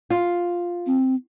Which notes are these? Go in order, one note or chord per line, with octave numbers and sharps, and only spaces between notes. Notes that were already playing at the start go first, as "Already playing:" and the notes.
F4
C4